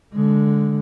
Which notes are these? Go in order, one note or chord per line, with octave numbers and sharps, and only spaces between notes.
D3 G#3